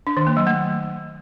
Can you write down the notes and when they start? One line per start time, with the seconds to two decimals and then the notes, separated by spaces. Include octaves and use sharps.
0.07 D4
0.17 D#3
0.27 A#3
0.37 F#3
0.47 A3